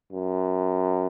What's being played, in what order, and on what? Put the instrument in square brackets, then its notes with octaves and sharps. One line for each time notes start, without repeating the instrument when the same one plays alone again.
[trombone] F#2